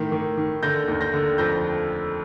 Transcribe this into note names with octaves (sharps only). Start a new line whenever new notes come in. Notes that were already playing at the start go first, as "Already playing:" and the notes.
Already playing: A2 D#3
D#3
D#3
D3 G6 A#6
D#2
G6 A#6
D3
F2 G6 A#6